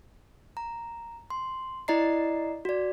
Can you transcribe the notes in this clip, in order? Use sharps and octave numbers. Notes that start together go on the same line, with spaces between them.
A#5
C6
E4 D5 D#5 A#5 C7
F#4 D5